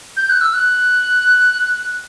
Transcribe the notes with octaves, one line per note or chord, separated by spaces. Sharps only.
G6
F#6
E6
F#6